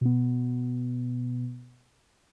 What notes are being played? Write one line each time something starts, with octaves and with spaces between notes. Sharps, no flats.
B2 B3